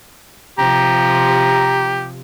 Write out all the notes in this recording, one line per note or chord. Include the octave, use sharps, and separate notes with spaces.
C3 F3 G4 A#5